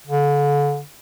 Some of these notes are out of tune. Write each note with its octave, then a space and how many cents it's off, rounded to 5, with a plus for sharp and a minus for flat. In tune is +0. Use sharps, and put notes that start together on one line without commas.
D3 -35